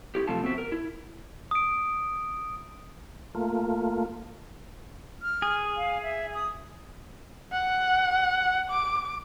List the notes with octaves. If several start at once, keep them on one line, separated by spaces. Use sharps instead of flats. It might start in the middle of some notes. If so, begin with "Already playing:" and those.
E4 G4
F#2 C3 F3 A3 F4 A5
B3 C4 F#4 E5
A#4
E4
D#6 D7
A3 A#3 F4
F6
G#4
F5
E5
D#6
F#5
D6